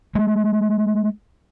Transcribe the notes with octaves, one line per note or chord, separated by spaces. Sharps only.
G#3 A3